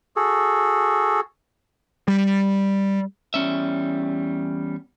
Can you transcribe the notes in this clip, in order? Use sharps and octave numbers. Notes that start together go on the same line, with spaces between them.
F#4 G#4 A4
G3
E2 G3 C#4 E5